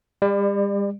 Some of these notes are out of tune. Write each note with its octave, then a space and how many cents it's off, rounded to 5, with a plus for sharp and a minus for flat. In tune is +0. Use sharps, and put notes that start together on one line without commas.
G3 +40 D5 +20